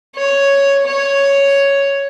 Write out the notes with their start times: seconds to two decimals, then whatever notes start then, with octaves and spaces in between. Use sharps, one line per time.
0.16 C#5
0.86 C#5